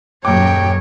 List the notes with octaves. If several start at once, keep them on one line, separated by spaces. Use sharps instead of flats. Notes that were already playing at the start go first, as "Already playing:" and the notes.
D#1 F#2 F#3 C#5 G5 D6